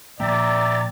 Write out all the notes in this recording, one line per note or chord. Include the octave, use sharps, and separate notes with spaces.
A#2 F3 A#3 D5 E5 G5 A#5 A6